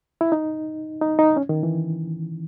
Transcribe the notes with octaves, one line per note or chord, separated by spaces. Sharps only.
E4
D#4
D#4
D#4
C#4
D#3
E3